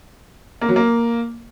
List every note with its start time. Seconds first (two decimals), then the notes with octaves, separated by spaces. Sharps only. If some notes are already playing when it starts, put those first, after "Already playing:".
0.61 A#3
0.69 F#3
0.76 A#3